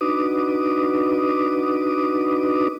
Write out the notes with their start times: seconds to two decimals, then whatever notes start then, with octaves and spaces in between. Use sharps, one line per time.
0.01 D4 D#4 F#4 B4 D6 D#6